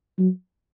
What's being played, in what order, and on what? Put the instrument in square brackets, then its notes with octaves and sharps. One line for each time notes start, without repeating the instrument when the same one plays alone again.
[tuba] F#3